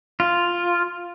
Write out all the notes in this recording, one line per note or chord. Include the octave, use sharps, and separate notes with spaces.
F4